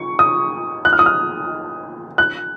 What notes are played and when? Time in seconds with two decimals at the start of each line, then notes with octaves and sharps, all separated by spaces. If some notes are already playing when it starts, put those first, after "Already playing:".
Already playing: C#6
0.19 D#6
0.85 F#6
0.93 F6
0.99 D#6
1.06 F6
2.18 F#6